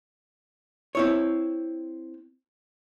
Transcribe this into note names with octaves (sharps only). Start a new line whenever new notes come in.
C4 E4 C#5